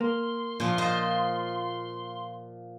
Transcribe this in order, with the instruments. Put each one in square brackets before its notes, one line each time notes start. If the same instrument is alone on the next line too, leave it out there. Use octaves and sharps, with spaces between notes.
[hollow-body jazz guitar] A#3 [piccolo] C6
[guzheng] A#2 F3
F4 C5 D#5